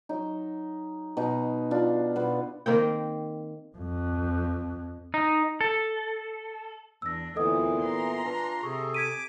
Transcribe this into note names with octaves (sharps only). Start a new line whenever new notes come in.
F#3 D#4
B2 D#4 D6
D4 F4
B2 B3
D#3 A#3 C4 G5
F2
D#4
A4
E2 D4 E6 A#6
D2 A#2 E3 B3 C4 A4 D#5 D#6
A#5 C6
D4 F4 B4 G#5
C3 G#4 A4 C#6
D6 G#6 B6 D#7